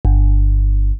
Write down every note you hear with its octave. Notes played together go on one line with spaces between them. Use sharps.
G1